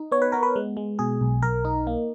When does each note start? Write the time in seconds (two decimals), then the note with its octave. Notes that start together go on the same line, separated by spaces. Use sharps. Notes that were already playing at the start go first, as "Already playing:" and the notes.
Already playing: D#4
0.12 B3 C#5
0.22 B4
0.32 B3 A#4
0.43 B4
0.56 G#3
0.77 G#3
0.99 B2 G#4
1.21 B1
1.42 B1 A#4
1.65 D#4
1.87 A#3